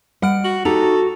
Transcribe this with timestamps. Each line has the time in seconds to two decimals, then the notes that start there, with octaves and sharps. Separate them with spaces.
0.22 G3 F#5 F6 D7
0.44 F#4 F#7
0.65 D#4 F#4 G4 A4 F7